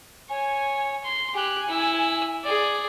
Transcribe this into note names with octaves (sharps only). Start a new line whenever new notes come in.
C#5 G#5
C6
G4 G#5 F#6
E4 E6
G#4 D5